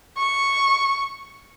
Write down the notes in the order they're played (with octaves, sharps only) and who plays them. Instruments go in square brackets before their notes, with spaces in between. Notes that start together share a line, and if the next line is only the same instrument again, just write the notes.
[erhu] C#6